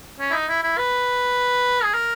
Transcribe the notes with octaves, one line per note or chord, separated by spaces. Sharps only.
C#4
E4
D#4
E4
E4
B4
G#4
A#4